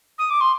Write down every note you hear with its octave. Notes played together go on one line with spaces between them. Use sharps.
D#6
D6
C6